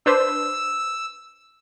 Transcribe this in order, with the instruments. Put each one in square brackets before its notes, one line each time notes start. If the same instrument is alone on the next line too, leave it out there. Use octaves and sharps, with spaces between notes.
[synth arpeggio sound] D4 B4 C5 [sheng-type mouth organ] E6